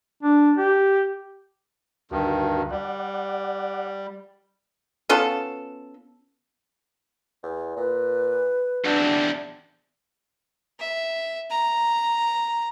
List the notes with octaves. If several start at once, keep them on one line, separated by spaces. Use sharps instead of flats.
D4
G4
D2 G2 D#3 F#4
G3 D5 F#5
B3 C#4 F4 A4
E2
A#2 B4
E2 C4 D4 F#4
E5
A#5